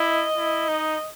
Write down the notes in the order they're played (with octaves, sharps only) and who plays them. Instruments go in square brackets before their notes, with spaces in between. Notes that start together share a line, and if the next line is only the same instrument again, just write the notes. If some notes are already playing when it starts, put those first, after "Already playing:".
Already playing: [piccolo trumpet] E4 [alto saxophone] D#5
[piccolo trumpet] E4
D#4